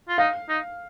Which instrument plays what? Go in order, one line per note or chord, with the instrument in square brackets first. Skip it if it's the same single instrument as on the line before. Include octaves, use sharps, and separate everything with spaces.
[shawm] F4
[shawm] D#4 [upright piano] F5
[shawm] D#4